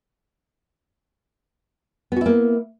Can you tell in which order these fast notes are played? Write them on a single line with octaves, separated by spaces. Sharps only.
B3 F#4 E4 A#3